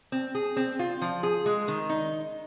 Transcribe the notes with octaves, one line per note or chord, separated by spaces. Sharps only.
C4
G#4
C4
F4
F3
G#4
G#3
D#3
D#4